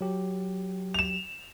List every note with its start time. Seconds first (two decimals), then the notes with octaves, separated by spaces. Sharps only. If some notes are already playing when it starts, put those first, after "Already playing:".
0.01 F#3 G4
0.94 E7 F7